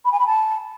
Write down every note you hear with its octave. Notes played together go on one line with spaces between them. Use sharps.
B5
G#5
B5
A5